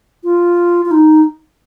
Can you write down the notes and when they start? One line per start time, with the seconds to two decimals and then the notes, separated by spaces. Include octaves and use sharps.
0.24 F4
0.85 F4
0.91 D#4